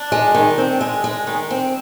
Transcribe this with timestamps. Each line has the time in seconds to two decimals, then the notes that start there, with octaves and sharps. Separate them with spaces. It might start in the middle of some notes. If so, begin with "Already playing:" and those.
Already playing: D4
0.12 G#3
0.35 D#3
0.58 C4
0.81 G#3
1.04 G#3
1.27 D#3
1.50 C4